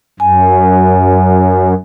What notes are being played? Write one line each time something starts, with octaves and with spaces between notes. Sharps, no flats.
F#2 G#5